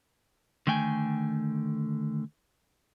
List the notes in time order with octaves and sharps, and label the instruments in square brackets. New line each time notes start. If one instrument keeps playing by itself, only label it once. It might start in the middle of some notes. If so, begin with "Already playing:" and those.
[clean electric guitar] D3 D#3 A3 G5 G#5